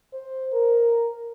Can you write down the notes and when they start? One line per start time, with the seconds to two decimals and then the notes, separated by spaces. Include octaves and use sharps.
0.13 C5
0.53 A#4